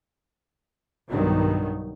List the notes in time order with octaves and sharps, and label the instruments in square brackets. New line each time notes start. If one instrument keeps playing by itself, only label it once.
[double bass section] B1 G2 D#3 F#3